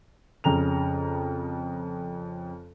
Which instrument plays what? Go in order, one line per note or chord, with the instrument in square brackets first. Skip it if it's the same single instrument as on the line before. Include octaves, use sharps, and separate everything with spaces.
[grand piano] F2 C#3 A#5 F7